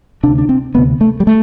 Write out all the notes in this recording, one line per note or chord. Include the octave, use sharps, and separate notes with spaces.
D2 C3 D4
D4
C4
D2 C3 B3
A3
G3
A3